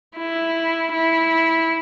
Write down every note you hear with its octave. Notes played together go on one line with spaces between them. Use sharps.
E4
E4